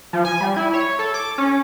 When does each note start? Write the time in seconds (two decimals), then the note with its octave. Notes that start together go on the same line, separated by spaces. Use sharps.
0.13 F3
0.25 G#5
0.41 G3
0.56 E4
0.74 C#5
0.99 A4
1.14 D6
1.38 C#4